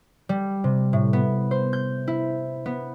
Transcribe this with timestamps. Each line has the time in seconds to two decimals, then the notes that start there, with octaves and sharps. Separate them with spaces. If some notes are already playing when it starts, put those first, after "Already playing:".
0.29 G3
0.64 C3
0.93 A2
1.13 B3
1.51 C5
1.73 G6
2.08 E4
2.66 B3